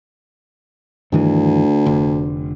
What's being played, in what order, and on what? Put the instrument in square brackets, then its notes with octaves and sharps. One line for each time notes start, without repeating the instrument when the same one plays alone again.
[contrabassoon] D2 [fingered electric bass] G2 D#3 E3
[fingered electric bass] F1 D3